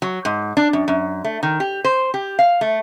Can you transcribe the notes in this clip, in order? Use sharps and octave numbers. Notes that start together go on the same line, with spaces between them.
F#3
G#2
D4
F#2
F#2
A3
D#3
G4
C5
G4
F5
A3